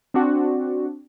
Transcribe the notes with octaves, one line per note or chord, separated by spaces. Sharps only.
C4 D4 F#4